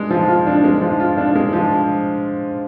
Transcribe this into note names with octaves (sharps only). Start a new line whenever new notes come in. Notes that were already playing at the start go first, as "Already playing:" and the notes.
Already playing: G#3 D4
F3
F4
D4
G#3
F3
F4
D4
G#3
F3